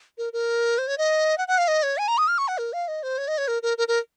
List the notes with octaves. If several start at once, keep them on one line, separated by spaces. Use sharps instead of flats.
A#4
A#4
C5
C#5
D#5
F#5
F#5
F5
D#5
C#5
G#5
A#5
D#6
F6
C#6
F#5
A#4
F5
D#5
C5
C#5
D#5
C#5
A#4
A#4
A#4
A#4